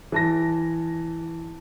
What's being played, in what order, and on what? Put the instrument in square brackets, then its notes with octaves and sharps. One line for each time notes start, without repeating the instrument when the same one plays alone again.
[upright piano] E3 A5 A#6